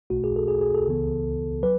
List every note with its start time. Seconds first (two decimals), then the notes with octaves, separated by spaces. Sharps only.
0.10 B1 B2 A3 F#4
0.24 G#4
0.36 A4
0.48 G#4
0.61 G#4
0.74 A4
0.87 C#2 C#3 E3 B3
1.63 F#3 B4